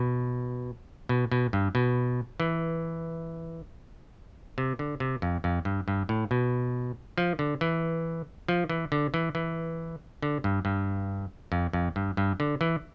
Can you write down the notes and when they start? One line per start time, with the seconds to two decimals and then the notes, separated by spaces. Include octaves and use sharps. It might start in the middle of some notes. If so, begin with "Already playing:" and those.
Already playing: B2
1.09 B2
1.32 B2
1.53 G2
1.75 B2
2.40 E3
4.58 C3
4.79 D3
5.00 C3
5.22 F2
5.44 F2
5.65 G2
5.88 G2
6.09 A2
6.31 B2
7.18 F3
7.39 D3
7.61 E3
8.48 F3
8.69 E3
8.92 D3
9.14 E3
9.35 E3
10.22 D3
10.44 G2
10.65 G2
11.52 F2
11.73 F2
11.96 G2
12.17 G2
12.40 D3
12.61 E3